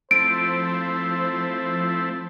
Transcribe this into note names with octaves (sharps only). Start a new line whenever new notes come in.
F3 A3 C4 E4 C5 D7